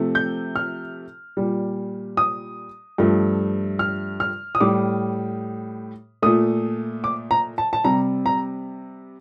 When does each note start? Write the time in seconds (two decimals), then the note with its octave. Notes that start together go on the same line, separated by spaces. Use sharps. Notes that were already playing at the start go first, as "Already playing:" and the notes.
Already playing: C3 F3 A3
0.15 G6
0.56 F6
1.37 A#2 G3
2.17 D#6
2.98 G2 F3 A3
3.79 F6
4.20 F6
4.55 D#6
4.60 A2 G3 D6
6.22 A#2 A3 D#6
7.04 D6
7.31 A#5
7.58 A5
7.73 A5
7.84 C3 G3 A#5
8.26 A#5